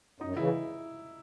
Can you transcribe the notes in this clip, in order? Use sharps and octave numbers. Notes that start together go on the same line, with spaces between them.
F#2 D#4
C#3 E3 E4